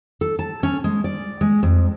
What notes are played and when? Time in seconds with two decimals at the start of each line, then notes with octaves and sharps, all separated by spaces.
0.21 A4
0.39 A5
0.63 C#4
0.84 G#3
1.04 D5
1.41 G#3
1.63 F2